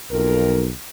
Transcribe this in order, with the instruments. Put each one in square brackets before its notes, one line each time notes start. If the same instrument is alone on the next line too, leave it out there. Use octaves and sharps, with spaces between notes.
[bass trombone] B1 [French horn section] F2 A#4